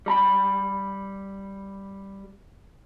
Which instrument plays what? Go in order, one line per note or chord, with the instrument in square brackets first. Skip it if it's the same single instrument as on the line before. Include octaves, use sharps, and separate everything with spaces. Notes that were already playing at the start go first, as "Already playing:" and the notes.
[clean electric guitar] G3 A#5 B5